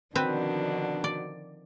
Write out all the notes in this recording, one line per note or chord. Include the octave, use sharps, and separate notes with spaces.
B2 D3 D#3 F3 C4 D4 F#4 B4
D5